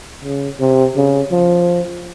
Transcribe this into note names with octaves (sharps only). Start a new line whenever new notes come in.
C#3
C3
C#3
F3